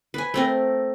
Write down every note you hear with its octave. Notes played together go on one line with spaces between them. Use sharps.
B4 G#5
A3 C4 A#4